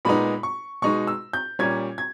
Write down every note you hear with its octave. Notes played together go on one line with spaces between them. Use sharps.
A#2 G#3 B3 D#4 B5
C#6
B2 G#3 D#4 C#6
E6
G6
A#2 G3 C#4 G#6
G#6